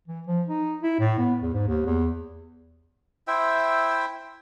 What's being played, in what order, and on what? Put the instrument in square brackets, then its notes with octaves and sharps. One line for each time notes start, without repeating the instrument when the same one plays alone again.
[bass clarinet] E3
F3
D#4
E4
A2
B3
E2
G#2
D#2
E2
[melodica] E4 C5 E5 G5